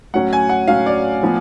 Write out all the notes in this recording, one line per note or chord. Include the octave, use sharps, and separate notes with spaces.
A2 F#3 C#4 F#5
G#5
F#5
A2 F#3 C#4 F5
D5
A2 F3 B3